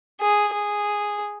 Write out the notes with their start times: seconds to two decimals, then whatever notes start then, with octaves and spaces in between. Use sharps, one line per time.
0.21 G#4
0.53 G#4